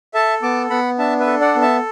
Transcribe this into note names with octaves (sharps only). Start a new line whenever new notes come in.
A4 E5 A5
B3 A5 D6
B3 F#5 B5
D4 E5 A5
B4 E5
A4
D5 F#5
B3
E5 A5